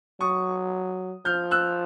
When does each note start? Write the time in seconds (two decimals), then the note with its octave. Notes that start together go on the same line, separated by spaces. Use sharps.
0.20 F#3 C#6 D#6
1.25 F3 F6 G6
1.51 E6 F#6